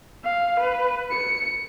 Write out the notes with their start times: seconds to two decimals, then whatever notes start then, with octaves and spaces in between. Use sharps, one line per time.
0.24 F5
0.60 B4
1.11 C#7